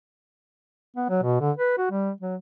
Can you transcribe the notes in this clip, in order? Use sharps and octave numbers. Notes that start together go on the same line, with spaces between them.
B3
F#3
B2
D3
B4
F#4
G3
F#3